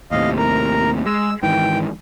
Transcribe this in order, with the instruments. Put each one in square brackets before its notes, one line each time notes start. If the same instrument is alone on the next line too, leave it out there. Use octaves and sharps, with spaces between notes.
[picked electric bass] D#2 A2 C3 [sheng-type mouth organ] D#5 F5
[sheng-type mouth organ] A#4 A#5
[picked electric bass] G#3 [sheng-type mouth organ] E6
[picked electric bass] G#2 D#3 E3 [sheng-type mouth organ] G5